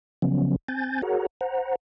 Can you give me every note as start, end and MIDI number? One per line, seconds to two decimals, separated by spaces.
0.22 0.56 49
0.22 0.56 53
0.22 0.56 54
0.22 0.56 59
0.22 0.56 61
0.68 1.01 60
0.68 1.01 80
0.68 1.01 91
0.68 1.01 93
1.02 1.26 66
1.02 1.26 68
1.02 1.26 70
1.02 1.26 73
1.02 1.26 78
1.02 1.26 82
1.41 1.75 72
1.41 1.75 78
1.41 1.75 82